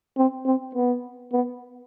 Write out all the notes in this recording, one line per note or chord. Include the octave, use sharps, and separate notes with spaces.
C4
C4
B3
B3